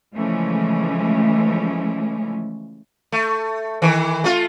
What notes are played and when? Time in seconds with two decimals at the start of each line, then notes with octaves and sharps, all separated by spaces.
0.14 C#3 E3 F3 G#3 A3 C#4
3.12 A3
3.82 D#3 E3
4.24 A3 F4